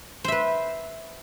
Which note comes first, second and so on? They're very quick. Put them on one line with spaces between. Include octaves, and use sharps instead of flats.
C5 E5 B4